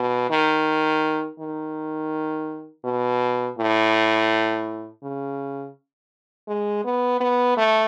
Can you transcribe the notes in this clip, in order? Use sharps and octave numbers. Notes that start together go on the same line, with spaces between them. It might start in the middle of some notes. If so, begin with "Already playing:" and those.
Already playing: B2
D#3
D#3
B2
A2
C#3
G#3
B3
B3
A3